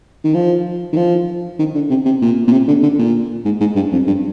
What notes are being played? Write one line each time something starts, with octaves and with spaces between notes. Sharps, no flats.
D#3
F3
D#3
F3
D#3
D3
C3
C3
A#2
A#2
C3
D3
D3
A#2
G#2
G#2
G2
F2
G2